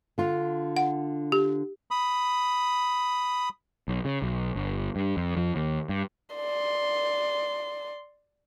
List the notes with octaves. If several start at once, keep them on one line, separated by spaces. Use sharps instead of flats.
D3 F4
F#5
G4
B5 D#6
B1
C#3
B1
G1
G2
F2
F2
D#2
G2
D5 C6